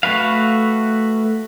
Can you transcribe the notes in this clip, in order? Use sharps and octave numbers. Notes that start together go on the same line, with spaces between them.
A3 F#4 B4 F5